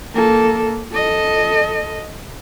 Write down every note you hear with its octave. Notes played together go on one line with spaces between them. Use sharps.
A#3 A4
A4 D#5